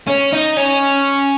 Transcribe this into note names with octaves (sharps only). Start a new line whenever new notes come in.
C#4
D#4
C#4